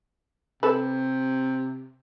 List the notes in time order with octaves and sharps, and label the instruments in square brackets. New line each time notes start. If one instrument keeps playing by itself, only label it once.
[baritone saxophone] C3 [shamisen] A4 B4